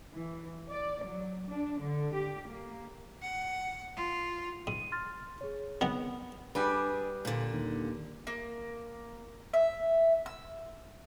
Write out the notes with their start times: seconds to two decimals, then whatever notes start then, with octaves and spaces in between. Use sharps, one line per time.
0.13 E3
0.69 D5
1.06 F#3
1.48 D4
1.80 D3
2.12 G4
2.48 A#3
3.22 F#5
3.96 F4
4.67 G#2 D#7
4.92 C6 F6 A6
5.41 G#4 C#5
5.81 C2 D#3 B3 A#4
6.55 G3 D4 G#4 B4
7.25 A#2 D3
7.53 D#2
8.27 A#3
9.54 E5
10.26 E6